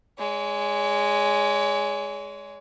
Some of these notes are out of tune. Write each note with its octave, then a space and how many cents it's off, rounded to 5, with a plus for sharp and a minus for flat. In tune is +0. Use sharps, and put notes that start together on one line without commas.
G#3 +0 C#5 +40